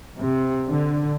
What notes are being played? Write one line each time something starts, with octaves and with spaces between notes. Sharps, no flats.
C3
D3